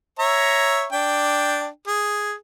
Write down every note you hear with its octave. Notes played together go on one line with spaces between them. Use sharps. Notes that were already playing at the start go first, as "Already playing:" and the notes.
C#5 E5 A#5
D4 G5
G#4